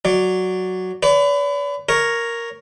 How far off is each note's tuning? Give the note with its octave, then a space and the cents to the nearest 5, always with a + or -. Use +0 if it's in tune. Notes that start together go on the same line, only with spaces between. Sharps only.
F#3 +0 D5 +0
B4 +30 D5 -40
A#4 +0 C#5 +0